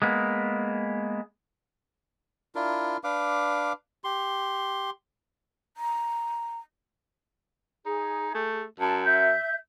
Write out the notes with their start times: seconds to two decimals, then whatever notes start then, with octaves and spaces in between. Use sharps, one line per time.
0.02 G#3 A#3 B3
2.55 D4 E4 F4 A#4
3.04 D4 B4 F5 D6
4.04 G4 C6
5.77 A#5
7.85 D#4 G#4
8.34 A3
8.80 F#2 A5
9.05 E5 G6